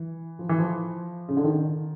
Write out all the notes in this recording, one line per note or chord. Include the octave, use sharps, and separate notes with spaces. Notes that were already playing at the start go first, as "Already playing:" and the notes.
Already playing: E3
F3
E3
F3
C#3
D3
D#3